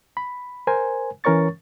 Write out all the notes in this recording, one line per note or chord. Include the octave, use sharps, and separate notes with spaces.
B5
A#4 C5 G#5
E3 C#4 A#4 C#5 C#6 A6